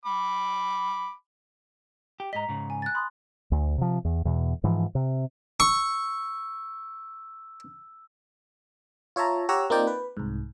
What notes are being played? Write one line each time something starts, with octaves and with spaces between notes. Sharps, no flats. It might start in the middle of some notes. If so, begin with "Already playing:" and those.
B5 D6
G4
G#2 D#5 A#5 B6
G#2 C#3
G#5
F#6 A6
B5 C6 D#6
D2
C3 F3
E2
E2 B2
G#2 E3 F3
C3
C#6 E6
F4 C#5 E5 A5 A#5
G4 C#5 F#5 A#5 E6
A#3 C4 D#4 F4 D5 G5
B4
C2 G#2